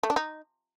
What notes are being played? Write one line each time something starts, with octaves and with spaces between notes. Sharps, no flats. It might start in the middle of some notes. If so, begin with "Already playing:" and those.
A3
D4
D#4